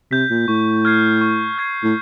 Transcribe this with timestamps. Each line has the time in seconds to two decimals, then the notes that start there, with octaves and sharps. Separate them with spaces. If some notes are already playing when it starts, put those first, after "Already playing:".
0.11 C3 G6 B6
0.30 A#2
0.48 A2 C#6
0.85 F6 G#6 C7
1.21 C#6
1.58 F6 G#6 C7
1.83 A2